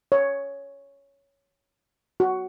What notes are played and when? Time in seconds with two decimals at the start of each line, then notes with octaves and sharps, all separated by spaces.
0.12 C#5
2.20 F#4